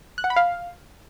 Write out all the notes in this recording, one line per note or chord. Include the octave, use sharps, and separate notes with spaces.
F#6
F#5
B5
F5